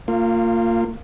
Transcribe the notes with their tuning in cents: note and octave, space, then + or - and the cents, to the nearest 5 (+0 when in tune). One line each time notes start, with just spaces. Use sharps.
A#3 -30 F4 +0